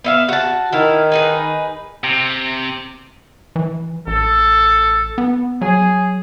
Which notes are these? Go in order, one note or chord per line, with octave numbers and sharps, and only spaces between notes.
B3 E5 F5
F#4 A5
D#3 E4 F5
D#4 G#4 B4
C3
E3
A1 A4
B3
F#3 G#4